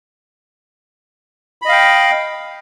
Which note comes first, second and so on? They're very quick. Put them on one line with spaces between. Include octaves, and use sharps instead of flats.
B5 D#5 F5 G5